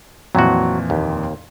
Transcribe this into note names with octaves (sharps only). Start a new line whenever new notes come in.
F2 A#2 E3 F#3 F#4
D#2